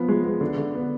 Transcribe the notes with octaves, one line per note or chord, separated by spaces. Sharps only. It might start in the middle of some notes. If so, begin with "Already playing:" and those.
Already playing: F3 B3
G#3
B3
D3
D3
B3